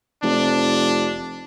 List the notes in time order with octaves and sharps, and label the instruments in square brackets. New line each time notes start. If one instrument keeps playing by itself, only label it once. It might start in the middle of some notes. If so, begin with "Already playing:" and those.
[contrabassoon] F1 [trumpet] D4